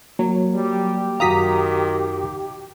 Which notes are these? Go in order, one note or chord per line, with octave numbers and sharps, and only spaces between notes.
F#3 A#3
G3 G4
F#2 D#3 F#4 F5 A#5 D#6 B6